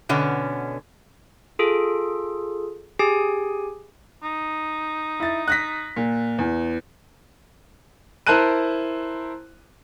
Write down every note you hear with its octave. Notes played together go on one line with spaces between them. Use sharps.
B2 D3 B3 C#4
F4 G#4 A4
G4 G#4 G#5
D#4
E4 A6
F#6 A#6 B6
A#2
E2
E4 A#4 C5 A5 F#6 D#7